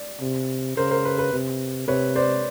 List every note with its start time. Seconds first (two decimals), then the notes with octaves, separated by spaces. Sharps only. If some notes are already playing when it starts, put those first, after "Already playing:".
Already playing: D5
0.21 C3
0.76 C#3 A#4 C5
0.91 A#4 C5
1.05 B4
1.18 B4
1.32 C3
1.88 C3 B4 C#5
2.15 C5 D5